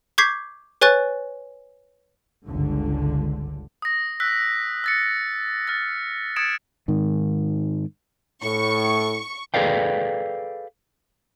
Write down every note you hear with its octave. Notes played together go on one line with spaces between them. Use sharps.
C#6 D6 G6 G#6 B6 C7
B4 C#5 G#5 C#6 F#6 A6
G1 C#2 D3
D#6 A#6
E6 F#6 B6
E6 A6 C#7
F6 A6
D#6 G#6 A6 C#7 D7 E7
G#2 D#3
A2 C#6
G#4 A4 B4 D5 F5 G5